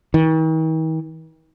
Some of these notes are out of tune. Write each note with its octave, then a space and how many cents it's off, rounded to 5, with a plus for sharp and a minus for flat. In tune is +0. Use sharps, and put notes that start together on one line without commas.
D#3 +45